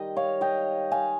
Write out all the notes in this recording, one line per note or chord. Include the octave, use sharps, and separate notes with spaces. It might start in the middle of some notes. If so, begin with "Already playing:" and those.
Already playing: D#3 G3 D#5 G5
C#5 F5
D#5 G5
F5 G#5